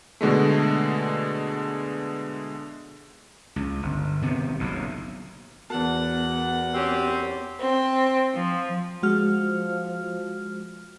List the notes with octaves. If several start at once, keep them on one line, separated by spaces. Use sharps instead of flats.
B2 D3 G#3 A3
C#2
G1
C3 D#3 B3
F#1 B1 A2
E2 B3 F#4 A#4 F#5 A5
C4 C#4 G4
C4
F3
F3 G#3 F#4 F6